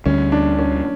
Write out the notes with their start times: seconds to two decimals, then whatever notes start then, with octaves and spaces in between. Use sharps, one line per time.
0.06 D2 D3 G3 C#4
0.32 D4
0.59 C#4